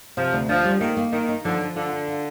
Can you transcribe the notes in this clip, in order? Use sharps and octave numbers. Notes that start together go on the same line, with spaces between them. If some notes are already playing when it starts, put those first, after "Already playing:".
C3 F3
D2
F3 D4
G3
D#3 A#3
A#3
D#3 D#4
D#4
D3 F3
F3
D3 F4
D4
F4